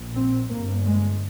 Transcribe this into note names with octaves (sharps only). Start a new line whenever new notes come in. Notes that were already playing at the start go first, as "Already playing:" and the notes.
Already playing: A#1 A#2
C4
G1 G2 A#3
G#3